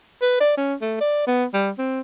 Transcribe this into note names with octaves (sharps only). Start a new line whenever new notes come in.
B4
D5
C#4
A3
D5
B3
G3
C4